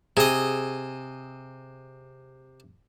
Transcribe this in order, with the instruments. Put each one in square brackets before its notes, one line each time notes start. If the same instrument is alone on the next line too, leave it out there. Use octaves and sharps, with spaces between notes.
[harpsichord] C3 D#5 [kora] G#4